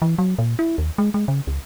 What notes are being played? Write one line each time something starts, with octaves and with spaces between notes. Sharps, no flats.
E3
F#3
A#2
E4
D#2
G#3
G#3
C#3
C#2